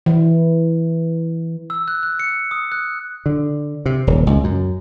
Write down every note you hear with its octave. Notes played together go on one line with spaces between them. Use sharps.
E3
E6
F#6
F#6
C#7
D#6
F#6
D3
C3
D#1
C#2
F#2